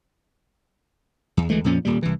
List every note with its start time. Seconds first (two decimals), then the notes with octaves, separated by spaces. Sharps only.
1.37 E2
1.50 D2 E3 G#3 A3
1.64 F2 A#2 F3 C#4
1.85 D#1 A#2 G3
2.03 C2 E3